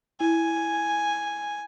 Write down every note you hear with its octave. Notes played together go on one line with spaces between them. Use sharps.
E4 G#5